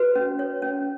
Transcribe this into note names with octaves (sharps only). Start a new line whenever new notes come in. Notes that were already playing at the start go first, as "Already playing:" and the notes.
Already playing: F#4 B4
C#4
C#5
C#4